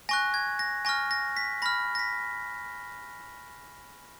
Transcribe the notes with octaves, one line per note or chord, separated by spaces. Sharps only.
G#5 C#6 F#6 A#6
G#6
A#6
G#5 C#6 F6 A#6
A#6
B6
B5 F6 A#6
A#6
B6